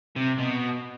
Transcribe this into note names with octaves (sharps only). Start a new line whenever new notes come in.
C3
B2